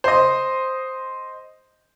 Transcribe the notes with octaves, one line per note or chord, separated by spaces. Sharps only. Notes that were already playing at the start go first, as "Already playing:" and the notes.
C5 D#5